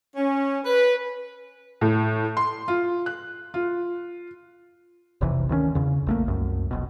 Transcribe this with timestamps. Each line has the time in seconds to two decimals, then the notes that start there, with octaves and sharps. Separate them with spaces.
0.16 C#4
0.64 B4
1.81 A2
2.37 C6
2.68 F4
3.06 F#6
3.54 F4
5.21 F1 B1 C3 E3
5.49 D2 D#3 A#3 C#4
5.75 E2 C#3
6.07 A#1 A3 A#3
6.28 C2 F#2
6.71 F1 B1 B2